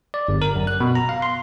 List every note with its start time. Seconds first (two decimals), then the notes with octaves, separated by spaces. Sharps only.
0.14 D5
0.28 G1
0.42 A#4
0.56 F#2
0.67 F#6
0.80 B2
0.95 A#5
1.09 F5
1.22 C6